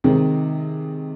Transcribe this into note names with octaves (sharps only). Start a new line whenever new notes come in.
C3 D#3 G#3 C4